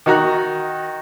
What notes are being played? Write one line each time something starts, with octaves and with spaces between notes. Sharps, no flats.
D#3 F#4 A#5 F#6